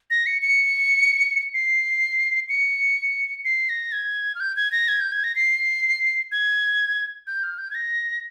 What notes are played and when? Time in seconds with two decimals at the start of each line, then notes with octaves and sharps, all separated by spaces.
0.10 A#6
0.26 C#7
0.42 C#7
1.54 C7
2.49 C#7
3.45 C7
3.69 A#6
3.92 G#6
4.35 F6
4.40 G6
4.56 G#6
4.72 A#6
4.88 G#6
5.00 G6
5.12 G#6
5.24 A#6
5.36 C7
6.32 G#6
7.27 G6
7.43 F6
7.58 G6
7.71 G#6
7.75 A#6